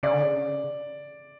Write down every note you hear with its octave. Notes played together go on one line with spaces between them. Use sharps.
C#3 D5
D3
C#3